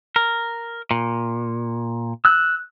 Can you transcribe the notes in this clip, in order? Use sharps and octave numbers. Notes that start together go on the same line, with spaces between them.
A#4
A#2
E6 F#6